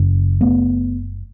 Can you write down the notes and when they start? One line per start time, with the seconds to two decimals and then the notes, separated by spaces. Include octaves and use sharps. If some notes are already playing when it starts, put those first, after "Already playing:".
Already playing: F#1 F#2 C#3
0.41 A3 B3